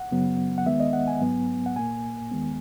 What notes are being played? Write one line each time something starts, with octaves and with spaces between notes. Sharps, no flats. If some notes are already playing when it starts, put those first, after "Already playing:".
Already playing: F#5
F#2 C#3 F#3 B3
F#5
D#2 D#3 G#3 B3 E5
D#5
F#5
G#5
G#2 F#3 B3
F#5
A#2 A#3 G#5
D#2 D#3 G#3 B3